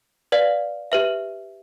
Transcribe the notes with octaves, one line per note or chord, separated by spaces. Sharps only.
B4 D5 F5
G4 B4 E5